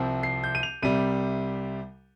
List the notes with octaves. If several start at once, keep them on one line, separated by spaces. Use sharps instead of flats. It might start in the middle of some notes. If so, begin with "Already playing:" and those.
Already playing: C2 C3 F3 C4
C7
G6
D#7
F7
C2 C3 G3 D#7